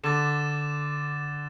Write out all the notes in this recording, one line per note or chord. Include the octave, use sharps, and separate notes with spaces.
D3 D6 A6 E7